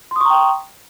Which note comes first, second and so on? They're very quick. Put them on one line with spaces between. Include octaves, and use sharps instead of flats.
C6 D#6 C#6 A#5 G5